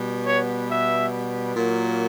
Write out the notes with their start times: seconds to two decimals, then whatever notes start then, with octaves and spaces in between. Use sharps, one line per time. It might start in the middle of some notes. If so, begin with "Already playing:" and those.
Already playing: B2 G3 B3
0.25 C#5
0.68 E5
1.55 A#2 F#3 A#3